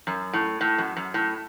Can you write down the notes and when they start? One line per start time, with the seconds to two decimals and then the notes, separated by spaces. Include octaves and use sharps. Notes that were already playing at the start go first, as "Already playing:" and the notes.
0.07 F#2
0.33 A2
0.61 A2
0.78 F#2
0.97 F#2
1.14 A2